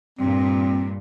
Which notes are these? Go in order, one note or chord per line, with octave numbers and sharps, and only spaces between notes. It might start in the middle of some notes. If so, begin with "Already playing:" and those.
G2 A#2 C4